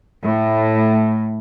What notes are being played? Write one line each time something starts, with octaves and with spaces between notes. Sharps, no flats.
A2